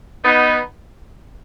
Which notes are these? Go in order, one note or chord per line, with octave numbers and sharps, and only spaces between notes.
B3 D#4